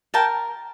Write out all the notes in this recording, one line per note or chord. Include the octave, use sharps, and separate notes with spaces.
A#4 G5 A5